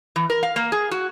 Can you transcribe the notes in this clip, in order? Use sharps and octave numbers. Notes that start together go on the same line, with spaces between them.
E3
A#4
F5
A#3
G#4
F#4